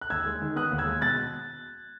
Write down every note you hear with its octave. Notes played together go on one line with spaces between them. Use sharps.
F#6
D#2 E6 G#6
G#3
D#3
B3 D#6 F#6
D#2
E6 G#6
G#3
B2 F#6 A6